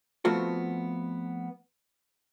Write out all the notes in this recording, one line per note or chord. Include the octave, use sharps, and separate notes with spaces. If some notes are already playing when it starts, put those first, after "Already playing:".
F3 A3 B3 C4 F4 F#4